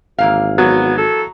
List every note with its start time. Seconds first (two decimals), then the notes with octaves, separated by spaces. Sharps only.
0.18 G#1 E3 A#3 F5
0.58 F#3 B3
0.98 A4